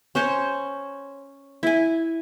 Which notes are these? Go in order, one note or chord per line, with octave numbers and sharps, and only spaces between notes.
C#4 C5 C#5
E4 G#5